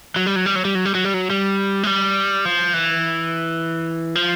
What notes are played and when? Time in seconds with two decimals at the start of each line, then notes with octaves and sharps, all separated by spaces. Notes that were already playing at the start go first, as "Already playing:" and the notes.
0.16 F#3
0.26 G3
0.36 F#3
0.46 G3
0.55 F#3
0.65 G3
0.75 F#3
0.85 G3
0.95 F#3
1.04 G3
1.14 F#3
1.30 G3
1.83 G#3
1.87 G3
2.45 F3
2.74 E3
4.15 F3